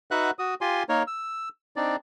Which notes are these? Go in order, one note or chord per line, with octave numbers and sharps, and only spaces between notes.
D#4 F#4 B4 E5 F#5 F#6
F#4 D#6
F4 G4 G#5 C6
A#3 D#4 A#4 C#5
E6
C4 D4 D#4 D5